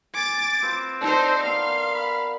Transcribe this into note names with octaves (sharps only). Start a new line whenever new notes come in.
G#5 D6 A6
C4 F4 B4
D4 D#4 A4 C5 C6
B3 A#4 D5 F5 C6
B5